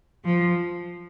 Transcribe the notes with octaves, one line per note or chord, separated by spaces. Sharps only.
F3